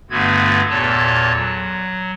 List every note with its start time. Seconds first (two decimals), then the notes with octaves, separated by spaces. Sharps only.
0.10 G2 D3 A3 B3 F#4 G#6
0.70 E2 A#2 A4 C#5 A5
1.35 F#3